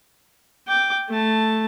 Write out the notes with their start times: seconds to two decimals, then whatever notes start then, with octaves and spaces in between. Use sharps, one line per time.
0.68 G5 D6
1.09 A3 A5